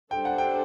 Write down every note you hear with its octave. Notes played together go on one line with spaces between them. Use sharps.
G3 D4 A4 C5 G5
F#5
G5